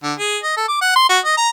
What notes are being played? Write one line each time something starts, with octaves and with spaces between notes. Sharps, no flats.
D3
G#4
D#5
A4
D6
F#5
C6
F#4
D#5
A#5